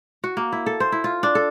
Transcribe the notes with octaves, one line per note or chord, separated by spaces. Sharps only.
F#4
A#3
E4
A4
C5
E4
F4
D4
A4